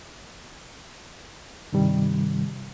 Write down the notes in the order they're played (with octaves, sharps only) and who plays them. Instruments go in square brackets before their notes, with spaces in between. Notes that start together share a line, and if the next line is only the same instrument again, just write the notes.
[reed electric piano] G2 C3 D#3 G3